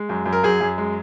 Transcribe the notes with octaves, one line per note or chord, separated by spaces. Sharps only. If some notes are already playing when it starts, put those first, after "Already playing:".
Already playing: G#3
F#2
F#2
A#4
F#2 G#4
F#2
G#3